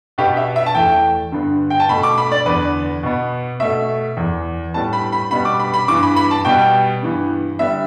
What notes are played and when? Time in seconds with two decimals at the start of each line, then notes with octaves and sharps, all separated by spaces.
0.18 B2 B3 G4
0.37 E5
0.56 E5
0.66 A5
0.75 E2 E3 A3 G5
1.32 G2 D3 B3
1.70 G5
1.80 A5
1.89 B2 A3 B5
2.03 D6
2.18 B5
2.32 D5
2.45 E2 D3 B3 B4
3.03 B2 B3
3.60 B2 A3 E5
4.17 E2 E3 B3
4.74 A2 G3 B3 A5
4.93 B5
5.12 B5
5.31 B2 G3 B3 B5
5.45 D6
5.59 B5
5.74 B5
5.88 G2 E3 B3 D6
6.03 B5
6.16 B5
6.31 A5
6.45 B2 G3 B3 G5
7.02 G2 E3 B3
7.59 D3 G3 B3 E5